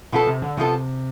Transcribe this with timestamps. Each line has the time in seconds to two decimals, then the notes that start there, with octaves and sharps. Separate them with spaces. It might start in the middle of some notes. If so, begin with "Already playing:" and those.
0.12 B2 F3 B3 F4 A4
0.27 C3
0.42 D3
0.57 C3 F3 B3 F4 A4